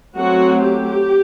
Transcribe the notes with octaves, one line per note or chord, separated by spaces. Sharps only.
F#3 A3 C4 F#4
G4